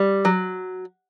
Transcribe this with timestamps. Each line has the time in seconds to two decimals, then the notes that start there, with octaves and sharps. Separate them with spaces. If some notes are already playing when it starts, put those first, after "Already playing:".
Already playing: G3
0.25 F#3